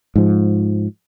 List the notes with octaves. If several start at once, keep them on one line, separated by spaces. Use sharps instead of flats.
G#2 F3